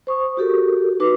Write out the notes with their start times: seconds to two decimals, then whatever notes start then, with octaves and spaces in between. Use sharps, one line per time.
0.07 C5 C#6 D#6
0.37 F#4 G4 A4 A#4
1.00 D#4 F#4 B4 D6